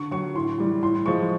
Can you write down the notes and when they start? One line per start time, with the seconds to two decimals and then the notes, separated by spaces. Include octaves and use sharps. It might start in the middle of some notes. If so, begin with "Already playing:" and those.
Already playing: D3 C#6
0.11 F#3 C#6
0.35 A2 C6
0.58 E3 G3
0.83 A2 C6
1.06 F3 G#3 C#6